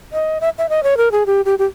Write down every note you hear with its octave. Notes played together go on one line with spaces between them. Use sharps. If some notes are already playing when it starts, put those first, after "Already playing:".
D#5
E5
E5
D#5
C#5
A#4
G#4
G4
G4
G4